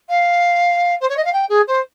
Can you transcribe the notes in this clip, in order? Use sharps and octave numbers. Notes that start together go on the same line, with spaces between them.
F5
C5
C#5
D#5
F5
G5
G#4
C5